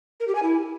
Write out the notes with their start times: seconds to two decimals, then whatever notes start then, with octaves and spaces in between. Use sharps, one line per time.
0.20 A#4
0.28 G4
0.35 G#5
0.43 E4